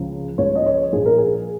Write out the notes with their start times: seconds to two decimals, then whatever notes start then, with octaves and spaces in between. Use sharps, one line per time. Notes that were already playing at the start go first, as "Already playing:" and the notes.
Already playing: C#2 C#3 F3
0.38 C#2 C#3 F3 C#5
0.55 D#5
0.66 C#5
0.93 A#1 A#2 F3 G#4
1.06 A#4
1.18 G#4